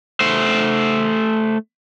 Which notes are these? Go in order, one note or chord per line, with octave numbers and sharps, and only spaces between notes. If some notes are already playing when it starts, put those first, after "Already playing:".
A3 C5